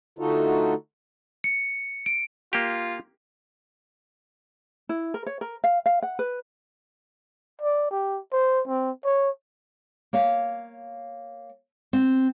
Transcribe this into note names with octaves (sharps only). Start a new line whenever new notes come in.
D3 A3 D#4 F4 F#4 A4
C#7
D7
A#3 F4 G4
E4
A#4
C#5
A#4
F5
F5
F#5
B4
D5
G4
C5
C4
C#5
A#3 C#5 F5
C4